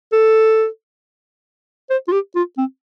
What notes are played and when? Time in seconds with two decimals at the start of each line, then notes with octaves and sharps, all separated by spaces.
0.13 A4
1.90 C5
2.08 F4
2.12 G4
2.36 F4
2.58 C4